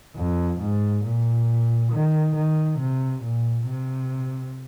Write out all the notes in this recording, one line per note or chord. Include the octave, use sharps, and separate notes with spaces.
F2
G#2
A#2
D#3
D#3
C3
A#2
C3